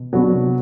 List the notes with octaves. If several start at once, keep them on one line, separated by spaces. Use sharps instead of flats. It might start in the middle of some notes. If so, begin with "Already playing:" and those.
Already playing: B2
B2 F#3 B3 D4 F#4
C3